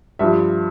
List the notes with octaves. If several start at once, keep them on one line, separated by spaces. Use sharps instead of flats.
G2 F3 E5